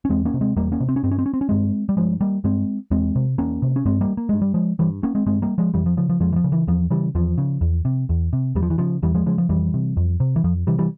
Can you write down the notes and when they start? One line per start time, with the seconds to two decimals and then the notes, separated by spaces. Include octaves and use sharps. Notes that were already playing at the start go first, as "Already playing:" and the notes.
0.05 C#4
0.10 E2 G#3 C4
0.25 A#3 C#4
0.34 C3
0.41 G#3 C4
0.56 E2 G3 A#3
0.72 A#3 C#4
0.80 C3
0.89 C4
0.96 C#4
1.03 G2 C4
1.11 C#4
1.19 C4
1.26 C#4
1.34 C4
1.41 C#4
1.49 G2 G#3 C4
1.89 G3
1.97 G2 F3 G#3
2.21 G3 A#3
2.44 G2 G#3 C4
2.91 E2 G#3 C4
3.16 C3
3.38 E2 A#3 C#4
3.62 C3
3.76 C#4
3.85 G2 G#3 C4
4.01 G3 A#3
4.17 A#3
4.29 G2 G#3
4.42 G3
4.54 F3 G#3
4.79 G2 E3 G3
5.03 A#3 C#4
5.15 G#3 C4
5.26 G2 G#3 C4
5.42 G3 A#3
5.58 F3 G#3
5.74 F2 E3 G3
5.86 F3
5.97 C#3 F3
6.09 F3
6.20 F2 F3 G#3
6.33 E3
6.36 F3
6.44 C#3
6.52 E3
6.67 E2 F3
6.90 C#3 E3 G3
7.15 E2 F3
7.38 C#3
7.61 E2
7.85 C3
8.09 E2
8.33 C3
8.55 E2 G3
8.62 F3
8.70 E3
8.78 C#3 F3
9.02 E2 E3 G3
9.15 F3 G#3
9.26 C#3 F3 G#3
9.38 F3
9.49 F2 E3 G3
9.74 C3
9.97 F2
10.20 C3
10.36 E3
10.44 F2 F3
10.67 C3 E3 G3
10.78 E3 G3